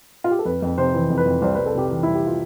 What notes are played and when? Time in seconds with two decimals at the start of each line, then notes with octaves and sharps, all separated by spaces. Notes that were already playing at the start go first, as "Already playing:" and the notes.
0.24 F4
0.31 G4
0.39 A4
0.45 F2 B4
0.62 F2
0.78 C3 C5
0.94 E3
1.10 F2
1.18 B4
1.26 F2
1.42 C2 C5
1.55 C2 B4
1.66 A4
1.75 C3 G4
1.90 E3
2.03 C2 E4
2.15 G4
2.27 F4